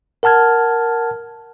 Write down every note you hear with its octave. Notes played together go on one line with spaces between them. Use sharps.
A#4 F#5 A5 F6 G#6